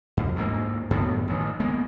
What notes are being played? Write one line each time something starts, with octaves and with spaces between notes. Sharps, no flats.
F2
D2 G#2 A#3
F#2 A2 D#3 B3
A1 D#3
G#3 A#3 B3